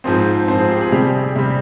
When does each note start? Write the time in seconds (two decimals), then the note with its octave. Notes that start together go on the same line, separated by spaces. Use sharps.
0.04 G#2 F3 C4 C5
0.48 G#2 F3 C4 C5
0.59 G#4
0.70 G4
0.81 G#4
0.92 C3 G3 C4 G4
1.14 G#4
1.36 C3 G3 C4